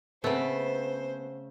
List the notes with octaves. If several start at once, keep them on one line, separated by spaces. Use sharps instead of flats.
C#3 A3 B3 C4 C5